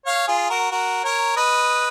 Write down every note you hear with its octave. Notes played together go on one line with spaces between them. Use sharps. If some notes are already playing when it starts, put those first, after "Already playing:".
C#5 F5
F4 G#4
F#4 A#4
F#4 A#4
A#4 C#5
B4 D#5